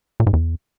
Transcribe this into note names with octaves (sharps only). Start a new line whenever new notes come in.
A#2
G#2
E2